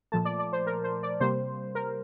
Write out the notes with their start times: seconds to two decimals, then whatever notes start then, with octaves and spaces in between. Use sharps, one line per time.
0.12 A#2 F3 A3 A5
0.25 D5
0.39 D5
0.53 C5
0.67 A#4
0.84 C5
1.03 D5
1.20 C3 G3 A#3 C5
1.75 A#4